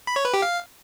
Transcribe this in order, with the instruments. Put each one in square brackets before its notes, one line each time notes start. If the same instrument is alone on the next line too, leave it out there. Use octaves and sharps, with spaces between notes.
[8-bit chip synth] B5
C#5
B4
G4
F5